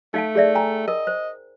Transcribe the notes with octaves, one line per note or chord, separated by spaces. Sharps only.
A3 D#4 F5 A5
G#4 D5 E5
G5 G#5 A#5
A#4 D#5
C5